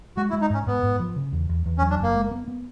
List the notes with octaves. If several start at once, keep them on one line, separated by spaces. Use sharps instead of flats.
G#3 F#4
E4
G#3
D#4
G#2 C#4
G#2 B3
G#2
F3
C#3
E2
E2
E2
C#4
F#3
D4
F#1 A#3
G#3
B3
B3